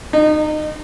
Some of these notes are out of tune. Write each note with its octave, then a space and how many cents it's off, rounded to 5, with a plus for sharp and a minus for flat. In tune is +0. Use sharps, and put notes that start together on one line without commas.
D#4 -25